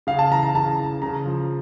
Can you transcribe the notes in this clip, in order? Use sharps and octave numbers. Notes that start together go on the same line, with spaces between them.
C#3 F5
A5
E3 A#5
A#5
C#3 A5
E3
C#3 A#5
F3